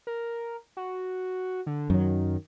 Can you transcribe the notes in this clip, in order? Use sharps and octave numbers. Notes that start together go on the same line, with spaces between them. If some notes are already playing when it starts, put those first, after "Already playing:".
A#4
F#4
D3
F#2 D#3 F#3